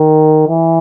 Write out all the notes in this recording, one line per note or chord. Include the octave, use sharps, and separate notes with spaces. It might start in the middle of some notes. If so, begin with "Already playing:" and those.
Already playing: D#3
E3